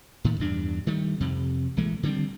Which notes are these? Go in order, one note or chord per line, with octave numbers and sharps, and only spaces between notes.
A2 D#3
E2 G2 D4
D#3 G3 A3
F2 C3
A#1 E3 G#3 A3
D3 D#3 G3 C4